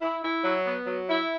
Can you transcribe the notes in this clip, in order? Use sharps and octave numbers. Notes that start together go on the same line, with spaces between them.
E4
E4
F#3
B3
F#3
E4